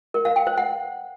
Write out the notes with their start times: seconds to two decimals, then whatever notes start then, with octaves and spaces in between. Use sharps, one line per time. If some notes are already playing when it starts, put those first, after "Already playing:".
0.14 A#4
0.25 F5
0.36 G5
0.47 C5
0.58 F#5